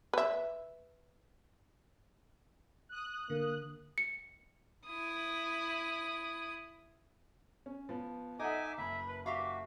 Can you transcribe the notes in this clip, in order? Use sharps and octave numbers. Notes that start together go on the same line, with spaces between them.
B4 E5
D#6 F#6
D3 A#3
C#7
E4 D#6
C#4
F3 B3
D#4 A4 D#5 E5 F#5 G#5 D6
F#1 E5 B5
B4
F#4 G4 E5 F5 D6